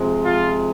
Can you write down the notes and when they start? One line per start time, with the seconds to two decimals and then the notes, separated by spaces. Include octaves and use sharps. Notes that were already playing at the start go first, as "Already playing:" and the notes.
Already playing: C3 F3 G#3
0.25 F4